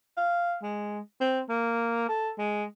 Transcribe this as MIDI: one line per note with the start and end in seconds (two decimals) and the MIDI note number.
0.17 0.55 77
0.63 0.99 56
1.21 1.40 60
1.49 2.08 58
2.09 2.31 69
2.38 2.64 56